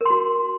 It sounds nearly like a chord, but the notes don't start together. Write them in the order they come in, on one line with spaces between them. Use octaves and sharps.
A#4 C6 F#4